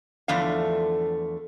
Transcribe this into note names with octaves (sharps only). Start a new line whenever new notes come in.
E2 D3 F3 A3 F5